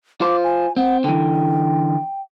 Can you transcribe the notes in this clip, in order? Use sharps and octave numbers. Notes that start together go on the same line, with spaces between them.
F4 C5 D6
G#5
C4 F#5
D3 E3 G5